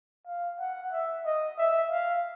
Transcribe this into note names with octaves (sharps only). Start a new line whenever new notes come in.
F5
F#5
E5
D#5
E5
F5